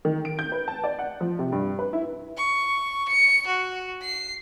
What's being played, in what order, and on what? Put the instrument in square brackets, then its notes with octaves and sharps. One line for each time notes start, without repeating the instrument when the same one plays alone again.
[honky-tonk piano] D#3
D7
G6
B4
A5
D5
F#5
F3
C3
G2
B4
E4
[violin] C#6
C#7
F#4
C7